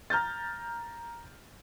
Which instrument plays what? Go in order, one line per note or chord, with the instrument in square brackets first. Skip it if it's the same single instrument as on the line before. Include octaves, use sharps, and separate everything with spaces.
[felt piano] A#5 F6 G6 A6